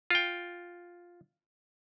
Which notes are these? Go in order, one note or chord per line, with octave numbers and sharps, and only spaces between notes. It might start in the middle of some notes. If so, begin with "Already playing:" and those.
F4 G5